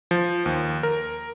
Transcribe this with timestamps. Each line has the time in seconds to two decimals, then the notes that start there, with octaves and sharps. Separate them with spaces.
0.11 F3
0.46 D#2
0.83 A#4